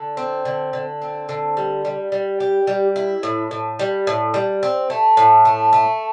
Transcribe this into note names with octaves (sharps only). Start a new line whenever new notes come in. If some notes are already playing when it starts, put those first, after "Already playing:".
Already playing: D3
C4
D3
D3
C4
D3
G3
G3
G3
G4
G3
E4
A2
A2
G3
A2
G3
C4
A3
A2
A3
A3